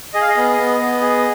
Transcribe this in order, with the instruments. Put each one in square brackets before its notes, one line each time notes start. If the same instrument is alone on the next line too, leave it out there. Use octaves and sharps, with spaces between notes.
[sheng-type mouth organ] G#4 D#5
F5
D#5
B3
B3
B3
G#4